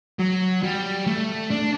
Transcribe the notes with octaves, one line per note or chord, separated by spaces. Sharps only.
F#3
G3
A3
D4